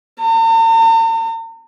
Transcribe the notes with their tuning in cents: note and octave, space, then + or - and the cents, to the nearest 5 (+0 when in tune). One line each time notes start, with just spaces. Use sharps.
A#5 -45